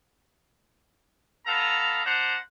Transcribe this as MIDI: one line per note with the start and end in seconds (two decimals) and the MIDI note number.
1.46 2.03 59
1.46 2.03 69
1.46 2.03 77
1.46 2.03 82
2.05 2.36 62
2.05 2.36 72
2.05 2.36 78
2.05 2.36 82